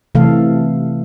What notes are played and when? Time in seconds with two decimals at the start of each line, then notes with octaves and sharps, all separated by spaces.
0.15 C3 E3 A3 A4 F5